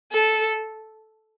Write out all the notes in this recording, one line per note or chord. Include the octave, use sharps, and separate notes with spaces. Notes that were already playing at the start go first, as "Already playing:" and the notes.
A4